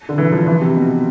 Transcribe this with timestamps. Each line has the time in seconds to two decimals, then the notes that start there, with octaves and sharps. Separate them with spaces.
0.09 D3
0.18 E3
0.32 F3
0.47 E3
0.62 C3
0.76 B2